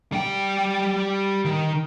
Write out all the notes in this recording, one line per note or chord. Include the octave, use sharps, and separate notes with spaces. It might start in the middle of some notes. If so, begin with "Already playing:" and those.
G3 G5
D#3